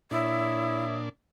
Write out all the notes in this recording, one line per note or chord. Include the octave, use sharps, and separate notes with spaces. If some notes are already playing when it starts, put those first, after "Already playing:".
A#2 D4 E4 C#5 E5 D#6 E6